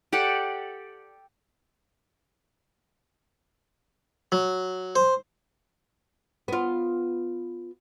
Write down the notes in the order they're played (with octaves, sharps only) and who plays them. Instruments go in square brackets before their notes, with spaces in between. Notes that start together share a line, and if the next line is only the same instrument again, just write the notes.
[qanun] G4 A4 D5 F#5
[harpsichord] F#3
C5
[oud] B3 F4